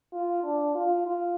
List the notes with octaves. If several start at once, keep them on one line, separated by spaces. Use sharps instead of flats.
F4
D4
F4
F4